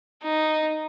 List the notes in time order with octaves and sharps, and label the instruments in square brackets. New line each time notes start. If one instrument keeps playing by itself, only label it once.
[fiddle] D#4